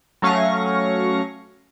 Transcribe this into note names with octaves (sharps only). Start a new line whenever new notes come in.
F#3 A3 C#4 F5 C#6 A#6